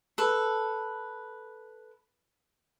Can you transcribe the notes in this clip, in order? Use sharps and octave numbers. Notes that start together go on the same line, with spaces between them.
A4 B4